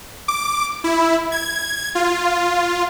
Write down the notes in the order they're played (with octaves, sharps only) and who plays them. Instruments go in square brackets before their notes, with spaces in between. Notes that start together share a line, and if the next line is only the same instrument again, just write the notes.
[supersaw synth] D6
E4
G#6
F4